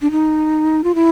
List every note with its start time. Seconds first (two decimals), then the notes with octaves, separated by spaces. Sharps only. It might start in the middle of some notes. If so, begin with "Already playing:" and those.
0.02 D4
0.11 D#4
0.84 F4
0.95 E4